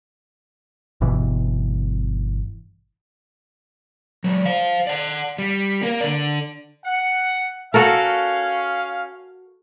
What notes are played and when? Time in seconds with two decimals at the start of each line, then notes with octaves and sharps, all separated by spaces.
1.01 G1 G2 B2 E3
4.24 F#3 G#3
4.46 C5 F5
4.87 D5 F#5
5.38 G3
5.83 A#3 A#4
6.00 D3 D5
6.84 F#5
7.74 C#4 F#4 A4 A#4 F5